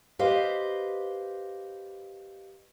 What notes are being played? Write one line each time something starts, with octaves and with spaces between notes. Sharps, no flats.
G4 B4 C5 D#5 F5